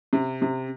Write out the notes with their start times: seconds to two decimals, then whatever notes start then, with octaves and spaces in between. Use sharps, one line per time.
0.13 C3
0.42 C3